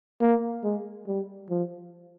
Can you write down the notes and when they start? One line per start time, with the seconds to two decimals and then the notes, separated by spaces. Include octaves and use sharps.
0.21 A#3
0.64 G#3
1.07 G3
1.50 F3